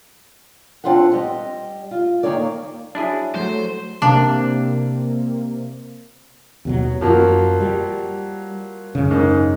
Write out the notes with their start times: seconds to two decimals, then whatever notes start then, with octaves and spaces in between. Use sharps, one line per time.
0.84 B3 C4 D4 F4 E5 F#5
1.12 G3 D#5
1.91 F4
2.23 D#3 A#3 D#4 C#5 D5
2.95 F#3 D4 E4 G#4
3.35 F#3 A3 C5
4.02 C3 A#3 C4 D4
6.65 D#2 B2 F#3
7.01 F#2 F3 F#3 A#3
7.61 G3
8.95 F#2 C#3
9.10 G#2 D#3